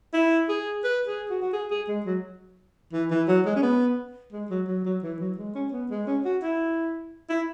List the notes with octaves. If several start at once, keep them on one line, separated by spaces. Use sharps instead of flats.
E4
G#4
B4
G#4
F#4
F#4
G#4
G#4
G#3
F#3
E3
E3
F#3
G#3
C#4
B3
G#3
F#3
F#3
F#3
E3
F#3
G#3
C#4
B3
G#3
C#4
F#4
E4
E4